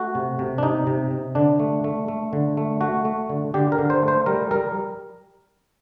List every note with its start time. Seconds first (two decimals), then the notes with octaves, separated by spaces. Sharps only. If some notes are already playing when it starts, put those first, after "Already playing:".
Already playing: A3 F#4
0.15 C3
0.39 C3
0.58 D4
0.63 C3 D#4
0.87 C3
1.11 C3
1.35 D3 D4
1.60 A3
1.84 A3
2.08 A3
2.33 D3
2.57 A3
2.81 A3 F#4
3.05 A3
3.30 D3
3.54 D3 G4
3.72 A#4
3.79 D3
3.90 C5
4.03 A3
4.08 C5
4.26 G3 A#4
4.51 G3 A#4